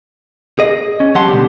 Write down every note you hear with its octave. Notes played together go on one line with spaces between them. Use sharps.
G#4 D#5
C#4
F#3 G4 F#5 A5 C6
B2 D3 G3 A3 G4